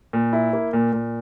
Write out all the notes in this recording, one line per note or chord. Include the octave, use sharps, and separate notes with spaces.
A#2
E4
A#3
A#2
A#2